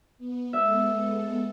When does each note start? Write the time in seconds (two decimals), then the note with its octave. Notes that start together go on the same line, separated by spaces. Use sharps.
0.18 B3
0.53 G#3 B3 A4 E5